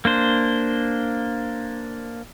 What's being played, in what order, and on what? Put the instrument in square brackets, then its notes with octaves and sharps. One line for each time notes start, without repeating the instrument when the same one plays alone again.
[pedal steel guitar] A#3 D4 C5